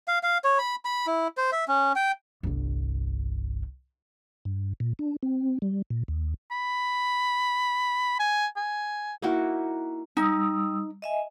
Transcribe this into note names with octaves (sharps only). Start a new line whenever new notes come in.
F5
F5
C#5
B5
B5
E4
C5
E5
C#4
G5
G1 C2
G2
A#2
D4
C4
G3
A#2
D#2
B5
G#5
G#5
A#3 D#4 E4 F#4
G3 D#4 D#6 E6
D#5 E5 G#5